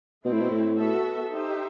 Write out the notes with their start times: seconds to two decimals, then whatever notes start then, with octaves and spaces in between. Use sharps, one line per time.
0.25 B2 A3 C4 E4
0.33 A2
0.41 B2
0.51 A2
0.78 B3 F#4 A4 E5
1.31 D#4 G4 C5 E5